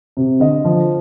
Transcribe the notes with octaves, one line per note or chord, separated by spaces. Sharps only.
C3
D3 D#5
F3